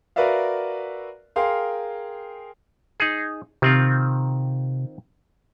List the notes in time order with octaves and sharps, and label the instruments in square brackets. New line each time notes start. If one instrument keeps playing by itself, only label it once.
[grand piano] F#4 A#4 B4 D5 E5 F5
G#4 A#4 F5 G5 C6
[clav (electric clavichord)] D#4 G#4
[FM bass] C3 [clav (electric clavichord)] D#3 C4 F4